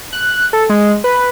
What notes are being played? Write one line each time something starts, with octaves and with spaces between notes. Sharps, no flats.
F#6
A4
G#3
B4